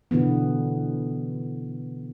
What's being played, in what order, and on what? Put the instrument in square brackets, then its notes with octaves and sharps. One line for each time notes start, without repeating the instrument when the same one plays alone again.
[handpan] B2 D3 E3 B3